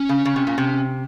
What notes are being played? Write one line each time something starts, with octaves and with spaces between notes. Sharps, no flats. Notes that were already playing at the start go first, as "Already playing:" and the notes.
Already playing: C#4
C#3
C#3
C3
A#2
C3